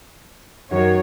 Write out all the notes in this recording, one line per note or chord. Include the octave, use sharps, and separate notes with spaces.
F#2 D#3 F#4 A#4 C#5